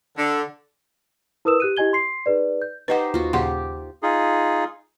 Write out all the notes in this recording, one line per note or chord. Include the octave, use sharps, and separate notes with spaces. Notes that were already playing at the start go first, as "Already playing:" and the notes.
D3
E4 A#4 B4 D#6 E6 E7
G4 F#6 D#7
E4 G4 D#5 G#5 G#6 G7
C6 C7
D#4 G#4 B4 D5
G6
D#4 G4 B4 C5 D#5 F#5
D#2 F4 F#4
D#2 A#2 C#3 G4 F#5 C6
D#4 F4 G#4